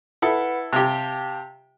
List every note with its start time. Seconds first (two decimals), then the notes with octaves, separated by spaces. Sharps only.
0.22 E4 A4 B4 F#5 B5
0.73 C3 G4 F5 G5 A5